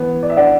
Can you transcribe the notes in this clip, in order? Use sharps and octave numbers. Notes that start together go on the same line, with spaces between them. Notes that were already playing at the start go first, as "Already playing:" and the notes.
Already playing: E3 B3
D5
E5
D4 D5 F#5